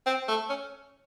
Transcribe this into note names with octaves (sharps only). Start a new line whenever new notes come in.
C4
A3
C#4